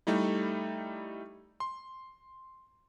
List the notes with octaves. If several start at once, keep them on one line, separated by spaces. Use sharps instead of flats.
G3 A3 D#4 E4
C6